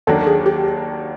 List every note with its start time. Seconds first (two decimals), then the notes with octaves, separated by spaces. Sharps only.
0.07 D#2 D#3 F#3 A#3 D4 A4
0.27 G#4
0.46 G4